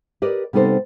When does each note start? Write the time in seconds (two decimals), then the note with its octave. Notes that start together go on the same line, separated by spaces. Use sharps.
0.22 G4 A#4 B4 D5 D#5
0.53 C3 G3 B3 D#4 A4 C5